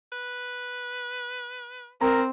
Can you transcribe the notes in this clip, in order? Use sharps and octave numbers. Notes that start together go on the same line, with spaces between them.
B4
C4 A#4 A#5